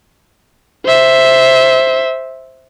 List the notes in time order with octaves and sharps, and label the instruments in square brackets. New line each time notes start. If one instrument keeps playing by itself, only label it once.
[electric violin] C5 E5